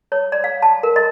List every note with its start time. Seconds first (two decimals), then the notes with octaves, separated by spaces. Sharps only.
0.12 C#5
0.32 D5
0.44 F5
0.62 A5
0.83 A#4
0.96 D#5